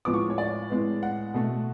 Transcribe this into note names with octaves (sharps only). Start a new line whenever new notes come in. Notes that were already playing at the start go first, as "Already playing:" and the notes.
A2 F3 G#3 B3 D6
C#6
C#5
D5
A2 G#3 B3
F#5
B2 A3